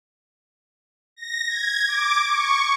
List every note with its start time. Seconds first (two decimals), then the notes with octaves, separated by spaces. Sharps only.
1.16 A#6
1.48 G#6
1.88 D6
2.27 C#6